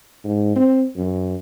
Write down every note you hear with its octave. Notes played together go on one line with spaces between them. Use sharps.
G#2
C4
F#2